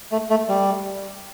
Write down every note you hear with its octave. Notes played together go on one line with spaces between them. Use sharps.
A3
A3
G3